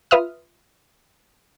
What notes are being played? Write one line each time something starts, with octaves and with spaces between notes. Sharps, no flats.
F4 B4 E5 D#6 F6